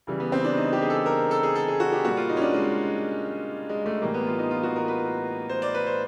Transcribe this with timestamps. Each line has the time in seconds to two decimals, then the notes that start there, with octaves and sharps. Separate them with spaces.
0.07 C#3 E3 G3
0.20 B3
0.32 C4
0.44 D4
0.57 D#4
0.73 G4
0.82 G#4
0.90 A4
1.06 A#4
1.31 A4
1.43 G#4
1.55 A4
1.68 G#4
1.80 F#4
1.92 G4
2.05 A#2 G3 F#4
2.17 F4
2.29 D#4
2.37 C#4
2.42 D4
2.54 G#3
3.69 G#3
3.86 A3
4.02 A2 E3 G3 A#3
4.14 B3
4.27 F4
4.39 D#4
4.51 F4
4.63 F#4
4.76 A#4
4.88 B4
5.49 C5
5.62 D5
5.74 B4
5.87 C5